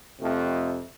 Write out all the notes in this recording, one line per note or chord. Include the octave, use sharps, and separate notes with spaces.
F2 C3 A3 C4